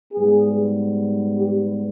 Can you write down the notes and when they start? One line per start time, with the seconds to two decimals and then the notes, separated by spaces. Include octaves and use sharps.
0.13 G#2 G3 B3 G#4
1.39 G4